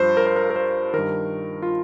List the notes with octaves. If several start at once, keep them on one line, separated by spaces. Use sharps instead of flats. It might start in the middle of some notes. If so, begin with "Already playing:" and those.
Already playing: G2 F3 C5
A#4
C5
A#4
A#4
C5
G2 D#3 A#4
F4